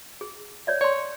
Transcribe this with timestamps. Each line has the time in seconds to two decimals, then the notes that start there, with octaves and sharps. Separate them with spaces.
0.21 G#4
0.67 C#5 D5 E5
0.81 C#5 D5 C6